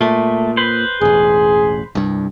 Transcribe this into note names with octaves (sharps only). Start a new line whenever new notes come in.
A#2 A3
B4 C5
E1 A1 G#4
C2 G2